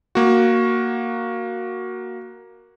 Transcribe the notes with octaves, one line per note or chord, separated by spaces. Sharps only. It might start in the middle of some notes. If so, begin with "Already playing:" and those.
A#3 F#4